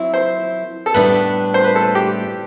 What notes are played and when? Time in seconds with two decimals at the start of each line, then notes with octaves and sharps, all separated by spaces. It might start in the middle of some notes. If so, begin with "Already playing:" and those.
Already playing: F#3 C4 E4
0.14 C5
0.86 A4
0.94 A2 G3 B3 D4 B4
1.54 C5
1.64 B4
1.75 A4
1.95 G4